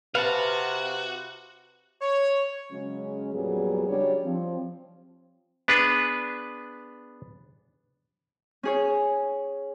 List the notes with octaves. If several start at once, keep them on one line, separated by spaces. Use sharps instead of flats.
C3 F#4 B4 F5 F#5 A5
C#5
C#3 F#3 G#3 C#4
F2 A#2 F#3 G3 B3 G#4
C#3 F#3 G3 D4 C#5 D5
F3 C4
B3 D4 G#4 B4
C#4 G#4 C#5